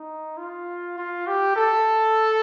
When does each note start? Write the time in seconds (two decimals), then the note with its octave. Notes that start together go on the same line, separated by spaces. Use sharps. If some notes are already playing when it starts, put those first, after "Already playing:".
Already playing: D#4
0.38 F4
0.98 F4
1.27 G4
1.56 A4